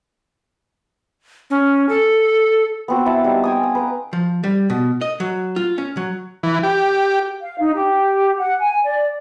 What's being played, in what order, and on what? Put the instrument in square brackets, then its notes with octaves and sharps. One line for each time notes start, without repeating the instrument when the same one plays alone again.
[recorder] C#4
A4
[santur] B3 C4 F#4
E4 F#5 A5
G3 D#4
G5 G#5 D#6
F5
B4 A#5
[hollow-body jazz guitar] F3
G3
B2
D#5
F#3
F4
C#4
F#3
[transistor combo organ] E3
G4
[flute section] F5
D#4
G4
F#5
G#5
D5